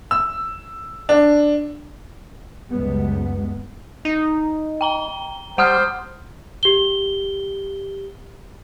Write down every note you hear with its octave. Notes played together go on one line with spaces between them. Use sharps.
E6
D4
C#2 F#2 G3 G#3 B3
D#4
G5 A#5 G7
G3 C5 F#5 D#6 F6
G4 G7